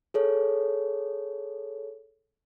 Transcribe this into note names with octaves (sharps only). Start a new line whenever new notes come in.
G#4 A4 C#5